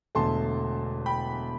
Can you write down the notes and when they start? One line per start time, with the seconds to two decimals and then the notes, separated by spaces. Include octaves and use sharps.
0.15 E1 E2 D3 A3 A5 C6
1.06 G5 B5